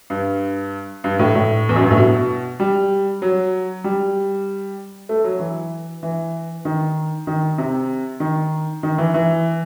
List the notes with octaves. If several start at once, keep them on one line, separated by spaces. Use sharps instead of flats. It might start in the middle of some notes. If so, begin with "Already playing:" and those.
G2
G2
A2
A2
E2
F#2
G2
A2
B2
G3
F#3
G3
A3
F#3
E3
E3
D#3
D#3
C3
D#3
D#3
E3
E3